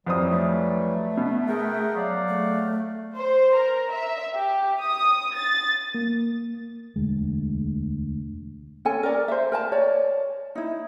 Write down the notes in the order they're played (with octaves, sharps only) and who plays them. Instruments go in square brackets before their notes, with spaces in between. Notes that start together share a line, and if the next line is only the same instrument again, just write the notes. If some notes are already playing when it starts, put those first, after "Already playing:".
[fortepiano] F2 C5 D#6 [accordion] E3 F#3 G3
[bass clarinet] A3
[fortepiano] B2
[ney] G#4 [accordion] A#4 F#5 G5
[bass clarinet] F#3 [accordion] D5 F5 F#5
[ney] A3
[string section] C5
A#4
E5
G4
D#6
A6
[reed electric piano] A#3
[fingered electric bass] E1 D2 G#3
[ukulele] C#4 A4 G#5
A#4 D5
C5 E5
A#4 G#5 A5
C#5 D5
D#4 E4